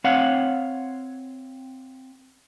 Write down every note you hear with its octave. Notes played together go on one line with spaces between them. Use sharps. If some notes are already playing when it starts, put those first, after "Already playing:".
C4 C#5 F5 F#5